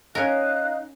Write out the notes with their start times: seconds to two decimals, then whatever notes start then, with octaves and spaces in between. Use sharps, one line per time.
0.15 C#4 D#4 A#4 F5 F#6